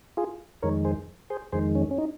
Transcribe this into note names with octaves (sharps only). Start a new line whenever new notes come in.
F4 G#4
F2 D#3 G#3 A#4 C#5
G#4 C5
G#4 C5
F2 D#3 G#3 G#4 C5
C#4
C#4
D#4